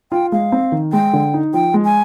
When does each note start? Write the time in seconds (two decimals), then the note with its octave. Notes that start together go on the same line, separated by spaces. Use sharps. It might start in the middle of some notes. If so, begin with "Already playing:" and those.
0.12 F4 G5
0.32 G#3 F5
0.52 C4
0.72 D#3
0.92 G#3 G5
1.13 D3
1.34 D#4
1.54 F3 G5
1.74 G#3
1.85 G#5